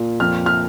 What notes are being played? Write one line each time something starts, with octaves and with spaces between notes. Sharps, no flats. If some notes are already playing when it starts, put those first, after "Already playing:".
Already playing: A#2
F2 F6
F6